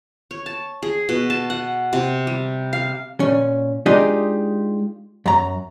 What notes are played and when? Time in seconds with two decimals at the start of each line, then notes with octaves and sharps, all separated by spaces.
0.31 C#5
0.46 A5
0.82 G#4
1.09 B2
1.30 A5
1.50 F#5
1.93 C3
2.27 G3
2.73 F5
3.20 A#2 C#4
3.86 G#3 D4 D#4 F4 G4 D#5
5.26 F#2 A#5